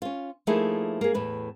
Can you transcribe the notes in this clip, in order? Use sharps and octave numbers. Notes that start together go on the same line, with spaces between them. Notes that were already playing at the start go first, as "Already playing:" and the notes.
C#4 F4
F3 A3 A#3 D#4 E4 G#4
A#3 G#4
E2 A2 B4